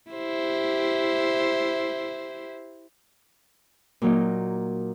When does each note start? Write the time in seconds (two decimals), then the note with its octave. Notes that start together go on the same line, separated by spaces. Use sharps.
0.11 E4 G4 C5
4.02 A#2 F#3 A#3 D#4